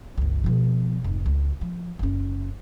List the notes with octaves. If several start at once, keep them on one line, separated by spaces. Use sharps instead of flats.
G1 C#2
B2 F3
F1 G#2
C#2
F3
F#1 C#4